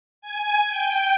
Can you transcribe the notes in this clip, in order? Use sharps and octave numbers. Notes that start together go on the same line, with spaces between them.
G#5
G5